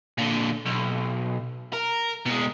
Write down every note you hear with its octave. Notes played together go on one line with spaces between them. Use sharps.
A#2 D3
B1
A#4
B2 G#3